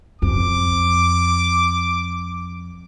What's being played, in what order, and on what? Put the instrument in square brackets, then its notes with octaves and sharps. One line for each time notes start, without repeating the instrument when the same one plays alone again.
[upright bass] F2 [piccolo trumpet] D6